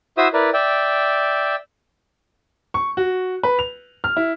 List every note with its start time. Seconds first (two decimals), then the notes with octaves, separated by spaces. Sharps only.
0.18 E4 F#4 C5 E5 D#6 E6
0.33 E4 A#4 B4 D5
0.53 D5 E5 G5
2.74 C#6
2.97 F#4
3.43 B4
3.59 F7
4.04 F6
4.17 E4